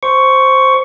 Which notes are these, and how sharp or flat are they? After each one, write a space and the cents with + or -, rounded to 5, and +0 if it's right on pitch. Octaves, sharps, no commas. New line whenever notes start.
C5 +0 C#6 +10